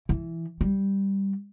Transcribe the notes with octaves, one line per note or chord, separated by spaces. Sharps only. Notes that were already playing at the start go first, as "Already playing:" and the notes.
E3
G3